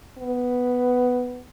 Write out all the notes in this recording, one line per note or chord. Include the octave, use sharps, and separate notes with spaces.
B3